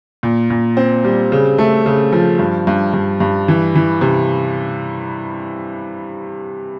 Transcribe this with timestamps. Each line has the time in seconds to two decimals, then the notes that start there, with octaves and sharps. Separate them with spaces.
0.23 A#2
0.50 A#2
0.77 C4
1.04 G3
1.32 C#3
1.58 A3
1.86 C#3
2.12 F3
2.39 G2
2.67 G2
2.94 G2
3.20 G2
3.48 E3
3.75 E3
4.01 C3